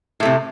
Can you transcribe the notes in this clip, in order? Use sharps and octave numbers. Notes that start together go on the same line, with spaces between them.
A2 C3 A3